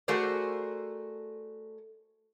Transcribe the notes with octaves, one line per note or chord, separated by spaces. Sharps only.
A3 F#4 G#4 A#4 C5 D5